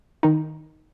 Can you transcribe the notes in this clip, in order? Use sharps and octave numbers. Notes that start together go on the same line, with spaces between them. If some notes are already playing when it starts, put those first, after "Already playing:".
D#3 D#4